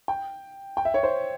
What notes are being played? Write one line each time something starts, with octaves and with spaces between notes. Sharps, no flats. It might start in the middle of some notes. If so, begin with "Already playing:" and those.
G5
G5
E5
C#5
C5